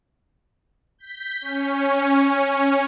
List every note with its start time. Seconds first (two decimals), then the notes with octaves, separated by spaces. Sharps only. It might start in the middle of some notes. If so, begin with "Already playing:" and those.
0.99 G6 B6
1.41 C#4